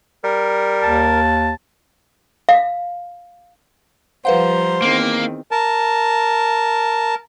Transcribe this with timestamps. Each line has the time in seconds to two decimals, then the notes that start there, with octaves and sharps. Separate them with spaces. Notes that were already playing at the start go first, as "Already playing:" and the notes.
0.24 G3 A#4
0.83 D#2 A5
2.49 F5
4.25 F3 G3 B4 C5 F5 F#5 A#5
4.82 E2 D#3 A#3 C4
5.51 A#4 A5